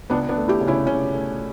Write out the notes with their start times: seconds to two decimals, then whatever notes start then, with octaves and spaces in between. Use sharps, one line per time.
0.10 C#2 B3 D4
0.29 B3 D4
0.36 A3
0.48 E4 G4
0.61 C#3
0.67 C#4 E4
0.87 C#3 C#4
1.13 A3